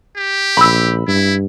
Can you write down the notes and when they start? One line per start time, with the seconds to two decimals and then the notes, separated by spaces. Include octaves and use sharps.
0.17 G4
0.57 A#1 B5 E6
1.08 G2 E4